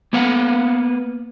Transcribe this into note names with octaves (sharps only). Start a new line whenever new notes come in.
A#3 B3 B4 F5 F#5